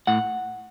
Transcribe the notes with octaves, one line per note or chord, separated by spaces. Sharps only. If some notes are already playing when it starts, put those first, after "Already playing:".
A2 F#5